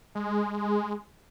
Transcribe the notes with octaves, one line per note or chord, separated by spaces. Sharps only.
G#3